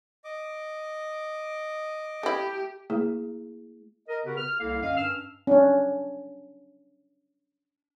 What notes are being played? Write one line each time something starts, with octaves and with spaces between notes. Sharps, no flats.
D#5 D6
A3 E4 G4
A3 A#3 E4 G#4
A#4 D#5
C#3 B3 F#4 G4 A#4 B4
F6
C2 A#3 E4 A4 F5
F#2 D3 C#4 D#5 F5
G2 C#4 E6 F6
C#4 D4